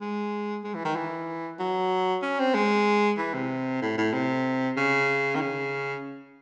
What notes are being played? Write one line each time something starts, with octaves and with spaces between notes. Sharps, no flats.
G#3
G#3
E3
D#3
E3
F#3
C#4
C4
G#3
E3
C3
A2
A2
C3
C#3
D#3
C#3